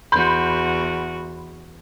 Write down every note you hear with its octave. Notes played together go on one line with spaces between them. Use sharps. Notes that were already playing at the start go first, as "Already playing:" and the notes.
E2 F#4 B5 C6 G6